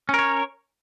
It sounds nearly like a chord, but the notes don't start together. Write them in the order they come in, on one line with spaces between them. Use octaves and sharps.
C#4 A#4 C#5